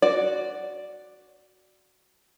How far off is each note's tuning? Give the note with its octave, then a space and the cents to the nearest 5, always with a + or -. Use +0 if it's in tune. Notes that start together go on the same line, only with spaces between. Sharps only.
F#4 +0 D5 +0